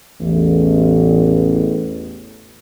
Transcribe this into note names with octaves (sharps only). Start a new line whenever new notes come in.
A1 E2